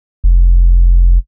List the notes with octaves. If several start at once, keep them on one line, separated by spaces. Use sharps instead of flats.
F1